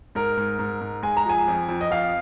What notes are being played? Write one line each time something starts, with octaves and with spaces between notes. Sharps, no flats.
G#2 A#4
G#2
G#2
G#2
G#3 G#5
A#5
F3 G#5
F2
F2
D#5
F2 F5